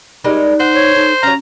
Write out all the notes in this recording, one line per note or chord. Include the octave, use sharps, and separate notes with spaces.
G3 G#3 D#4 A#4
C5 F#5
C#5
D#4 A4
F#3 C#4 F5 A#5